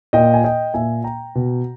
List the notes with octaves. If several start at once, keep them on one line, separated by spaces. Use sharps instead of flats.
A#2 D#5 G5
G#5
D#5 G5
A#2 E5 G#5
G5 A#5
B2